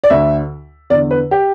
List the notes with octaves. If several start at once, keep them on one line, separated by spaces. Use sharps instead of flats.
D5
D2 D3 E5
E2 D3 D5
B4
G4